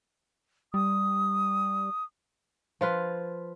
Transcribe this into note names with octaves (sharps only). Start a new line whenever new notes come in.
G3 D#6
F3 F4 B4